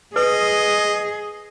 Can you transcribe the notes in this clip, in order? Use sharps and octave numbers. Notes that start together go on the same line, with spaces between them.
G#4 B4 D#5